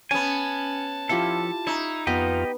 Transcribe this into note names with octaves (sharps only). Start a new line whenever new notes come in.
B3 C#4 G#5 A5
F3 E4 F4 G4 A4
D#4 E4 C#6
F2 B3 F4 G4 D#5